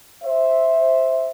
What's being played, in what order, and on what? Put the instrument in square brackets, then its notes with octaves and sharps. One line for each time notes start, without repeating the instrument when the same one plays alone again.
[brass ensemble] C5 E5